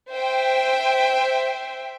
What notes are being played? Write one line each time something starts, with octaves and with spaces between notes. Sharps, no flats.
C5 E5 G5